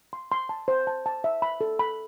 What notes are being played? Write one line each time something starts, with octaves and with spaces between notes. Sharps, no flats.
C6
C6
A5
C5
A5
A5
E5
B5
A4
B5